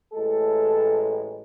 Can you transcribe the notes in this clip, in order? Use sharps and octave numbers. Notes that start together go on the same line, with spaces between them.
A1 A2 G#3 A4